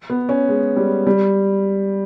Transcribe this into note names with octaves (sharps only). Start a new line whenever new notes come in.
B3
C#4
G#3
G3
G3